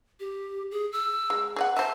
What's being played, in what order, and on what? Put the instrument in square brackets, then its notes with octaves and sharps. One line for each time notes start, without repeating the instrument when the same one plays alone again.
[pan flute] G4
G#4
E6
[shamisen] G#3
G#4 D#5 F#5
[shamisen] C5 E5 [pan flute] A5